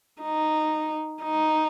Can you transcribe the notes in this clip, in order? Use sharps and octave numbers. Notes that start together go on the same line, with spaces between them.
D#4
D#4